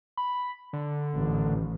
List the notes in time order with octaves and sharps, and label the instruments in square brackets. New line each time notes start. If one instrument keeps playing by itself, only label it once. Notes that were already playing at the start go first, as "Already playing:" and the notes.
[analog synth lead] B5
D3
[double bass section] A1 D#3